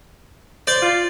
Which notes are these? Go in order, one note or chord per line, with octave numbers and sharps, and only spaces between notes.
C5 D5
F4